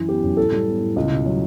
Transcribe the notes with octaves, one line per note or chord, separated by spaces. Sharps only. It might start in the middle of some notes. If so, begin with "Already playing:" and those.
Already playing: F#2 E3
B3 G4
F#2
A2 A4
G3
B3
A2
C#2
B2
F#3